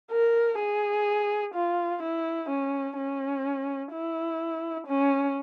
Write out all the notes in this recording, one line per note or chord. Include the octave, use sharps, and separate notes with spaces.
A#4
G#4
F4
E4
C#4
C#4
E4
C#4